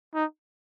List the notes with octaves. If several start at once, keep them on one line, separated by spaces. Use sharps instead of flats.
D#4